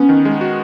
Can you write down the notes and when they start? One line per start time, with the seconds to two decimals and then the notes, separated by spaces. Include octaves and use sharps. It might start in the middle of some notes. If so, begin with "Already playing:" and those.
Already playing: B3 C#4
0.09 D#3
0.25 G#3
0.41 F#4